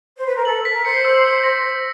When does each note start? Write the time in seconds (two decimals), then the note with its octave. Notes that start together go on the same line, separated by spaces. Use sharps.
0.18 C5
0.26 B4
0.36 A#4
0.44 A4 F#7
0.65 B6
0.71 A#4
0.84 C5 C#7
1.05 E6
1.25 C#7
1.44 A#6